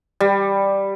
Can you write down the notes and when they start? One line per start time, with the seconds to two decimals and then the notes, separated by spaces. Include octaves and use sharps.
0.20 G3